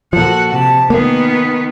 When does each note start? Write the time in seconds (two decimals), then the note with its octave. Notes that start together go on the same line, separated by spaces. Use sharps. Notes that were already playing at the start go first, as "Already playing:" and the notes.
0.13 A#2 F3 F#4 A4 F#5
0.53 C3 A5
0.90 D#3 A#3 B3 F4 G#4